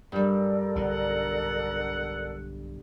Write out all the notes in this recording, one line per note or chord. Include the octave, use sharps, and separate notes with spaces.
G2 G3 A4 A#4 D5
B1 D3 F#5